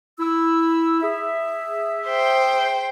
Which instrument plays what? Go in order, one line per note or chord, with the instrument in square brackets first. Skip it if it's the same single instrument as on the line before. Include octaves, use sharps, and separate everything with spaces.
[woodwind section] E4 E6
G#4 E5
[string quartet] C5 G5